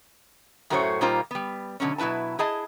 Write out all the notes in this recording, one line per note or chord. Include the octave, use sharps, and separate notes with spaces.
F#2 A2 A3 F#4 C5 C#5
A#2 G3 A#3 D#4 F4 C5
G3 B3
B2 D3 F#3 C#4
B2 F#3 E4 B4 A5
E4 G#4 D#5 A5